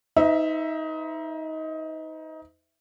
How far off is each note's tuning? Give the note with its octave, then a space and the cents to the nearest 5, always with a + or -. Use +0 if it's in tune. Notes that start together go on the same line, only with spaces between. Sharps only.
D#4 +25 C5 -40 E5 +0